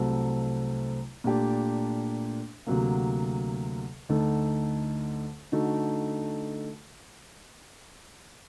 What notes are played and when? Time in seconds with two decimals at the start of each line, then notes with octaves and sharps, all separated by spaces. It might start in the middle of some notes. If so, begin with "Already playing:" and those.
Already playing: C2 C3 F#3 A3 C4
1.24 A#2 A3 D4 G4
2.67 D2 C3 F#3 A#3
4.09 D2 D3 A3 D#4
5.52 D3 A3 D#4 F#4